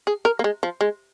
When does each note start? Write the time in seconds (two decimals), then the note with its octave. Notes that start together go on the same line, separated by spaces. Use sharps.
0.07 G#4
0.25 A#4
0.39 A#3
0.44 G#3
0.63 F3
0.81 G#3